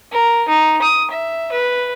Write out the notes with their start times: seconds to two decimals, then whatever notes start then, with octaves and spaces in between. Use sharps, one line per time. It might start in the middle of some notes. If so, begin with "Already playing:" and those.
0.12 A#4
0.48 D#4
0.82 D#6
1.10 E5
1.52 B4